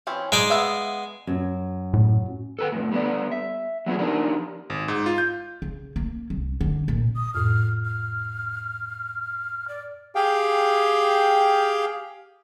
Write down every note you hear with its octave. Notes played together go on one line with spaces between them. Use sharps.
E3 C4 C#4
G#3 D#4 D5
B3 E5 F5
F#2
A2
A4 B4 G5
F2 A2
G3 B3 D5
E5
F#3 B3 C#4 F4 G#4
F3 D4 D#4 G4 A#4
G#1
G#2
F4
G6
C#3
A#3
C2
D3
A#2
D#6
F2 A2 F6
F6
D5
G4 G#4 F5 G5